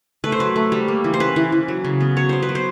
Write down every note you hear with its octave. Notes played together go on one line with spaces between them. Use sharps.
A3 B4
C5
F#3 B4
A3
G3
A#3
E3
C5
C#4 B4
E3
E3
F#3
C#3
B3
F#3 C#5
B3 C5
B4
F#3
C5